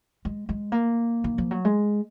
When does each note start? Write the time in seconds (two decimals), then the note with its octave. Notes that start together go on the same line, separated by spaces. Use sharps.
0.25 G#3
0.49 G#3
0.72 A#3
1.24 D#3
1.38 F3
1.51 F#3
1.65 G#3